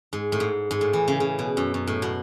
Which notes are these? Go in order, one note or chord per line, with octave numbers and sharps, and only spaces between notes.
G#2
A2
G#2
G#2
A2
E3
C#3
C#3
B2
F#2
F#2
A2
B2